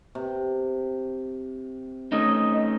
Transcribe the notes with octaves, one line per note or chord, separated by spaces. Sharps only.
C3
A3 C#4 D#4 D#5